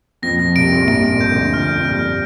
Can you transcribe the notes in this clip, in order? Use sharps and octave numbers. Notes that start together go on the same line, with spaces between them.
F2 F3 A#6
F2 F3
C2 C3 D7
C3
A#1 A#2
G2 D7
A#1 A#2
G6
D2 D3
F2 F3 F6
F2 F3
G2 G3 F6